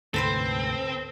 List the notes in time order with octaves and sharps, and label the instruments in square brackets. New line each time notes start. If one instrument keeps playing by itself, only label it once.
[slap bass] D2 G#2 C3 [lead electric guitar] C4 [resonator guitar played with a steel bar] A4 B4 C5